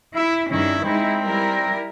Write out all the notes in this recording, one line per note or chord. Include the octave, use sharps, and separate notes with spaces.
E4 E5
G2 D#3 C#4 E4
G#3 C4 D#4 E4
G3 E4 A#4